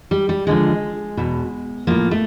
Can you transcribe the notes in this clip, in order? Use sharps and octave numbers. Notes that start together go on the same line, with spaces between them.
G3
G3
D#2 D3 F3 G#3
E2 B2
A2 F3 A#3
A3